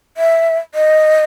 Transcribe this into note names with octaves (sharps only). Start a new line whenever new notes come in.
E5
D#5